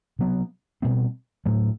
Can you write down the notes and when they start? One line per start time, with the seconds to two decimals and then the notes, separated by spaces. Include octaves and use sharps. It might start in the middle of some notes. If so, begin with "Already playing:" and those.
0.19 C3 F#3 B3
0.82 B2 G3 C4
1.46 A2 F#3 A3